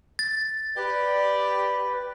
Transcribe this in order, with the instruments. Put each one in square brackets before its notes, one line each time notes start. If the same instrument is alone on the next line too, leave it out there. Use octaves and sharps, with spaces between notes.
[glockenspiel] A6
[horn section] G4 D5 [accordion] B4